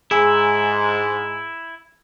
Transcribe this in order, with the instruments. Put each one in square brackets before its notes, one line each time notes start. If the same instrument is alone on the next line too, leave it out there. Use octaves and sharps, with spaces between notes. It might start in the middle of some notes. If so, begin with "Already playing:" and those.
[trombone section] G#2 [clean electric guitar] E4 [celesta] G#4 G#5 E6